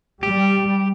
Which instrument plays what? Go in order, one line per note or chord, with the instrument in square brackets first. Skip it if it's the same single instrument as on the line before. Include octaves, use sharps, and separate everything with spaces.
[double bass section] G3 [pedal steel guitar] G4